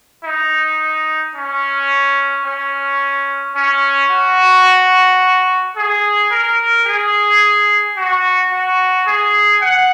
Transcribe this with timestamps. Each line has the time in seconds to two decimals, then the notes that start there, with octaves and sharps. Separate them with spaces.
0.25 D#4
1.36 C#4
2.46 C#4
3.56 C#4
4.11 F#4
5.76 G#4
6.31 A#4
6.87 G#4
7.96 F#4
8.52 F#4
9.07 G#4
9.62 F#5